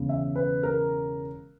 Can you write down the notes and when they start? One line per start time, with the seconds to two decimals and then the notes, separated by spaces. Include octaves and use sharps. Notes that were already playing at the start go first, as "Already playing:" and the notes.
Already playing: E1 E2 C#3
0.09 E5
0.36 B4
0.63 A#4